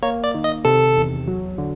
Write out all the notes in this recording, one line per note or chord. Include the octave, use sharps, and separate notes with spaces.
A#3 C#5
D5
D#3
D#5
C3 A4
E2
F#3
D3